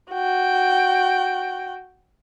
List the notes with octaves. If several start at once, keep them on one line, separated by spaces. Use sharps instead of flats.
F#4 G5